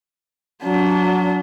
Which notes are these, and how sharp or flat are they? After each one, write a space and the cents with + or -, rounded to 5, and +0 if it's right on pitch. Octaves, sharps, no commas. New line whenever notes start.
F#3 -15 D4 -35